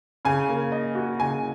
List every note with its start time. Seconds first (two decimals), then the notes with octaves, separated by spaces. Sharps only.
0.25 C#3 G#5
0.48 A#3
0.72 D#5
0.95 F#4
1.19 C#3 G#5